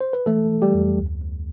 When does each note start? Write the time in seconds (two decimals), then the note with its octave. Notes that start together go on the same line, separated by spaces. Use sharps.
0.01 C5
0.13 B4
0.26 E3 A3 A4
0.51 E3
0.62 G3 G4
0.74 F2
0.99 D2
1.22 D2